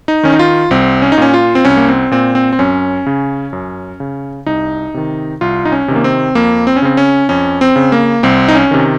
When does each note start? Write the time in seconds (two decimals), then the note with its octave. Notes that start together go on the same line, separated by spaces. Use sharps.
0.08 D#4
0.23 D#3 C#4
0.32 D#4
0.39 F4
0.71 C2 C4
1.02 C#4
1.12 D#4
1.18 A#2 C#4
1.34 F4
1.55 C4
1.65 C2 C#4
1.77 A#3
1.88 C4
2.11 A#2 C4
2.35 C4
2.53 C4
2.59 F#2 C#4
3.06 C#3
3.53 F#2
4.00 C#3
4.46 C2 D#4
4.94 C3 D#3
5.41 C2 F4
5.65 D#4
5.72 C#4
5.88 C3 D#3
5.96 A#3
6.04 C4
6.35 F2 A#3
6.67 C4
6.76 C#4
6.82 C#3 C4
6.97 C#4
7.29 F2 C#4
7.61 C4
7.76 C#3
7.92 A#3
8.23 C2 C4
8.48 D#4
8.55 C#4
8.71 C3 D#3